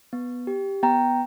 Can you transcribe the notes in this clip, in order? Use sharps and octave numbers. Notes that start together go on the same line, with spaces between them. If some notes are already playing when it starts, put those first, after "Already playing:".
B3
G4
B3 G5 A#5